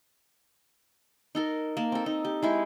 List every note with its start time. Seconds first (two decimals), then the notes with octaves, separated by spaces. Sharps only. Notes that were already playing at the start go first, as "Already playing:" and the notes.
1.35 D#4 A4 A#4
1.77 A#3 A5
1.92 C4 A4
2.06 D#4
2.25 G4
2.42 G#3 E4 G4